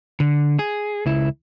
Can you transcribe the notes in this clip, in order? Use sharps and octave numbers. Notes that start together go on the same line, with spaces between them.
D3
G#4
C#2 E4